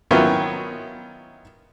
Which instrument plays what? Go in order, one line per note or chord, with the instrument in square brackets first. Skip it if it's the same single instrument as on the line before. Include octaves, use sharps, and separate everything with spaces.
[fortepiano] D#3 F#3 B3 C#4 E4 F4